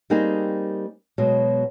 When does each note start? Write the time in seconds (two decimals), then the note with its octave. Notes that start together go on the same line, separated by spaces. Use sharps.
0.10 G3 A#3 C4 D#4 G#4
1.18 B2 F#3 G#3